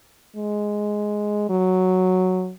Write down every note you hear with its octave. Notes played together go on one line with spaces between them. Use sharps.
G#3
F#3